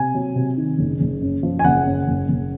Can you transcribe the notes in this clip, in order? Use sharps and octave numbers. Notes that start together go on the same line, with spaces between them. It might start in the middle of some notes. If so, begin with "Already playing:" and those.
Already playing: C3 G#5
F#3
C3
D#3
F#1
F#1
F#2
F3
G#5
F#1 F#5
F#2
F#1
F#1